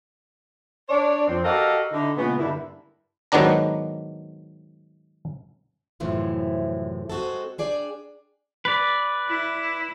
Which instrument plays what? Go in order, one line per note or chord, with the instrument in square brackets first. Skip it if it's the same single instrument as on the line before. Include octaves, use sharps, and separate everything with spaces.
[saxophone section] D4 C#5 D5
F2 C4
F#4 G4 A4 A#4 D#5 F5
D3 D#4 E4
A#2 C#3 G#3 B3
G2 D3 G3 A#3 E4
[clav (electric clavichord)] G#2 D#3 F#3 B3 D4 A#5
[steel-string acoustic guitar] F#2 A2 C3 E3 F3
G#3 C4 F#4 G#4 A4
D4 G#4 D5 G5
[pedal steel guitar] B4 D5
[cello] E4